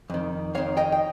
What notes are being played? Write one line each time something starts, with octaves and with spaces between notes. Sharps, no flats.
F2 D#3
F2 D#3 C#5 F5
D#5 G5
G5